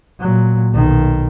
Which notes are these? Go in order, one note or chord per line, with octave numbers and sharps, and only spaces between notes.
A#2 F#3
B1 D#3